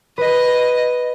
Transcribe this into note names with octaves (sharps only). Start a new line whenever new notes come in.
B4 D#5